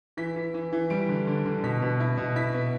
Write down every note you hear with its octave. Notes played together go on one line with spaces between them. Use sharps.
E3 B6
E3
E3
E3
G3 D7
D3
D3
D3
B2 B6
B2
E4
B2
E4 B6
B3